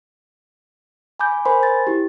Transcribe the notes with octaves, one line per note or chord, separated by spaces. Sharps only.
G#5 B5 D6 G6
A#4 C5 G#5 B5 C6
A6
E4 G4